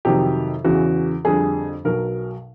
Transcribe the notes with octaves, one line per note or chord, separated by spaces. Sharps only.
F2 C3 D#3 F#3 G4
E2 C#3 E3 F#4
F2 D3 G3 G#4
B1 B2 F#3 A#4